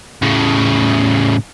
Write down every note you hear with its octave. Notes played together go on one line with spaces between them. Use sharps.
A2 C#3